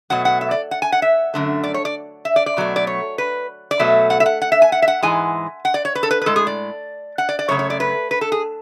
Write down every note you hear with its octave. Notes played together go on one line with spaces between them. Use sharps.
B2 F#3 A3 F#5
F#5
E5
D5
F#5
G#5
F#5
E5
F#2 D3 A3
D5
C#5
D5
E5
D5
D5
B2 F#3 A3
D5
C#5
B4
D5
B2 F#3 A3 E5
F#5
E5
F#5
F#5
E5
G#5
F#5
E5
F#5
G#2 E3 G#3 G#5
F#5
D5
C#5
B4
A4
B4
B4
A2 G#3 A4
G#4
D5
F#5
D5
D5
F#2 C#3 A3 C#5
C#5
D5
B4
B4
A4
G#4